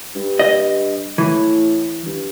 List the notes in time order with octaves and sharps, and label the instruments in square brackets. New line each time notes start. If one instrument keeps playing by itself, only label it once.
[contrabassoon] G2
[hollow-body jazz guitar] D#5
[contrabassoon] A2 [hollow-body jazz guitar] E3
[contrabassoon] G2